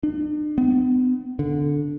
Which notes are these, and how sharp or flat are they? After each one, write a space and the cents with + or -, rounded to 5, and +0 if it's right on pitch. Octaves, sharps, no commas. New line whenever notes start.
D4 +40
B3 +40
D3 -10